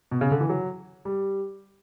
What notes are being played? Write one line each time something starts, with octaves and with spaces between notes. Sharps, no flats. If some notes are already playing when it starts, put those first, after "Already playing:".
B2
C#3
D3
E3
F#3
G3